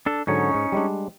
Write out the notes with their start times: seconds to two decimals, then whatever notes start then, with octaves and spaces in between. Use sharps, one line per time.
0.06 D4 A4
0.27 G#2 D3 F#3 C#4 D#4 C#5
0.54 G#2
0.72 G3 G#3 D4